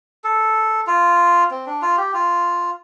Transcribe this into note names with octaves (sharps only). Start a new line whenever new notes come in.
A4
F4
C4
D4
F4
G4
F4